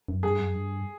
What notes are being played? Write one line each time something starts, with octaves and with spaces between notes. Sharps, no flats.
F#2
G2 G#4
F#2
G2